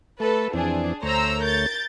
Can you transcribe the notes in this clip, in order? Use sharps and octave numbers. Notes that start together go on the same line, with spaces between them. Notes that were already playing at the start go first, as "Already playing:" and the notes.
A3 A4 B4
F2 E3 C4 D4 G#4
D2 A3 C5 C#5 A#5 E6
A#4 G6 A6